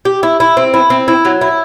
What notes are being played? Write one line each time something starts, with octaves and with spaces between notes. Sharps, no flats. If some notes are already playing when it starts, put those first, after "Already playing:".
G4
E4
E4
C4
E4
C4
E4
F#3
E4